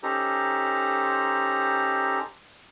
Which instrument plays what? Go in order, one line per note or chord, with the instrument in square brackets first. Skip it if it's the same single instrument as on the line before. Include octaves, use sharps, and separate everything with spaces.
[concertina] C#4 D#4 G4 A4 C5 A#5